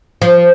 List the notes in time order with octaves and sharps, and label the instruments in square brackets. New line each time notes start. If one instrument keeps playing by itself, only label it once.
[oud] F3